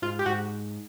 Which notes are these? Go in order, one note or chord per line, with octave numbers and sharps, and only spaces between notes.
G#2 F4
G4
G#2 F#4